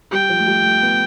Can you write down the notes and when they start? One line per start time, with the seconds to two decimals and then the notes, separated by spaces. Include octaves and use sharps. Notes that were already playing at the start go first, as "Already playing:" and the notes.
0.12 G3 G5
0.29 F3
0.39 A3
0.47 G3
0.64 A3
0.82 B3